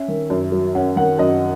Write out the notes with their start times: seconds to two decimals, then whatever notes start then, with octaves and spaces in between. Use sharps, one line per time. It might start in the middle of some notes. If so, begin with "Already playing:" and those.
Already playing: C#4 E5
0.08 D#3
0.30 F#2
0.52 F#3
0.75 C#4 F#5
0.96 D#3 F#5
1.18 F#2 D#5